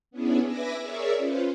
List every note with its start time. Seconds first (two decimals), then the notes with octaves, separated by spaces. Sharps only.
0.11 B3 C#4 D4 E4 G#4
0.45 B4 E5 G#5 D6 A#6
0.79 G#4 A#4 C#5 D5 E5
1.17 C#4 F4 B4 C5